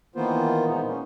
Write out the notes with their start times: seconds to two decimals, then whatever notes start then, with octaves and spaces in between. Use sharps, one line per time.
0.16 D#3 E3 A#3 B3 F4 C5
0.66 A#2 G#3 B3 D#4
0.86 C#4